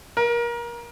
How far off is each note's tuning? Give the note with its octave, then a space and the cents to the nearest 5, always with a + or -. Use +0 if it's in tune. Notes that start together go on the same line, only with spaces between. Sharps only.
A#4 +25